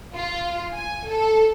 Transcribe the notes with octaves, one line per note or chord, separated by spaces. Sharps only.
F4
G#5
A4